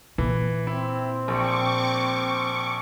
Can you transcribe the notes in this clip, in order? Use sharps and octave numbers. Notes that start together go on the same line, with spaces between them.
A#2 E3
C4 E4
A#1 C#6 D6